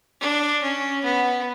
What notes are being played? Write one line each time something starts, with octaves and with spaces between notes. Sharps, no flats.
D4
C#4
B3